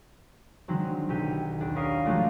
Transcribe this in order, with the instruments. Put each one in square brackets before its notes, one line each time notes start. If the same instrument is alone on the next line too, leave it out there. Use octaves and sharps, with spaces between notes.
[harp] D3 D#3 F#3 G#3 C4
B1 F#3 G4 D#7
D#1 D4 D5
C#4 A#4 F5 D#6 C7
F3 F#3 G#3 A3 D4 F4